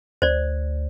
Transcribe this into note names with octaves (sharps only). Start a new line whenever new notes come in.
D2 C5 D5